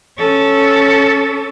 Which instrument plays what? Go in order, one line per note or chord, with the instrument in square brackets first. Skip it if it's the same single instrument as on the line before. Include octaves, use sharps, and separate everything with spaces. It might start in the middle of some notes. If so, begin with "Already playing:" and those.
[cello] C#4 A4